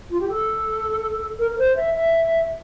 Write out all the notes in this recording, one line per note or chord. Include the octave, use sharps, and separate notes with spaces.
F4
G4
A4
A#4
A#4
C5
E5
E5